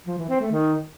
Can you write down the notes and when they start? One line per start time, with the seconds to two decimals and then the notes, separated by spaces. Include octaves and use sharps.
0.07 F3
0.18 E3
0.29 C4
0.40 A3
0.51 D#3